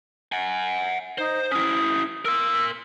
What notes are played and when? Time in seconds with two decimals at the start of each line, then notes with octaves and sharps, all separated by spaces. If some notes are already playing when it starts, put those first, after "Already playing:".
0.32 F#5 G#5
1.18 D#4 C5
1.51 C#4 E4 D#6
2.25 A#4 C6 E6